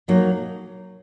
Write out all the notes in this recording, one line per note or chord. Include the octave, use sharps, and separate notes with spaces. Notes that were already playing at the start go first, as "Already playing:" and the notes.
B2 F#3 A#3 D#4